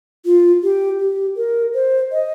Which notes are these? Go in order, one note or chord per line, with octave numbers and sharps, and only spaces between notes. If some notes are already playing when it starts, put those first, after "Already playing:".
F4
G4
G4
A#4
C5
D#5